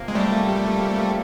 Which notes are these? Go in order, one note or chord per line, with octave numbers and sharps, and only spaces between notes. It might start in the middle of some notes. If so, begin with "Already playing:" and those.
Already playing: C3 F3 A#3
G#3
G3 A3